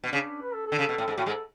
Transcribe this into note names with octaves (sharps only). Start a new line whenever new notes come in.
B2 D4
C#3
B4
A4
A4
D3
C#3
B2
A2
G#2
A2 F#4
G#2 G#3
A4